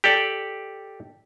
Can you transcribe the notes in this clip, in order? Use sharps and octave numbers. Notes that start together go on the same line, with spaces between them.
G4 A4 D5